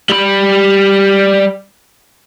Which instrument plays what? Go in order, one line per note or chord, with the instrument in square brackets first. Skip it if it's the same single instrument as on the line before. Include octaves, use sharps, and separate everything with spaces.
[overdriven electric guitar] G3 B5